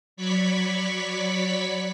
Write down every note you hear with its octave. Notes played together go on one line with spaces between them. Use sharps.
F#3 C#5 D5 B5 C#6 B6